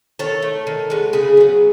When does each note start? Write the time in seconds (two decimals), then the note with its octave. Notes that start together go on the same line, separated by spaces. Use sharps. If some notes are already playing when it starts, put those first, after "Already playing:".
0.19 D#3 A4 C#5
0.42 A3
0.67 D#3
0.90 G#3 B3
1.13 C#3 G#4 B4
1.37 F#3 B3